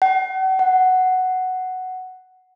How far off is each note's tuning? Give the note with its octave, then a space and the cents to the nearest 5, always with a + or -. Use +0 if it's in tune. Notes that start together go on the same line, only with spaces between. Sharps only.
F#5 +40
F#5 +5